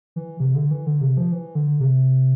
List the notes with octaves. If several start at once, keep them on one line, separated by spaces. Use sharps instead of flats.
E3
C3
D3
E3
D3
C3
F3
E3
D3
C3